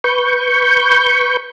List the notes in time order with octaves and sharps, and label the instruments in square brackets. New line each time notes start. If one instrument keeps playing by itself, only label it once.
[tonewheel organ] B4 C#6 G6